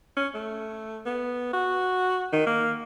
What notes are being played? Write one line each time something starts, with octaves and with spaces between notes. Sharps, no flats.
C#4
A3
B3
F#4
D#3
A#3